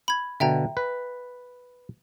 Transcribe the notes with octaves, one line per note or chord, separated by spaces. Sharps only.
B5 G#6
B2 D3 E5 G5 A#5
B4